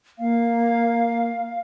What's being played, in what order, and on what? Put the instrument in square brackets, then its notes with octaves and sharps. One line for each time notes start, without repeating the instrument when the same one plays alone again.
[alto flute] A#3 [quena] F5